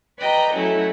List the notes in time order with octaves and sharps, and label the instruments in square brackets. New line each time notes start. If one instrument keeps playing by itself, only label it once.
[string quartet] B4 D5 D#5 G5 A#5
F#3 A3 C#4 E4 F#4